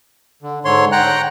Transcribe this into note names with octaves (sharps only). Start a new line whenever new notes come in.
D3
G#2 D3 C#5 C6
F#5 G5 A#5 F#6